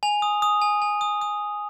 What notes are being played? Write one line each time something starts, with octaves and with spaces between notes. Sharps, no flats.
G#5 F7
D#6
D#6
G#5
G#5
D#6
D#6